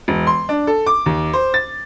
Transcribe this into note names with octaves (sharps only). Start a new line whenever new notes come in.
E1
C6
D4
A4
D6
D#2
C5
A6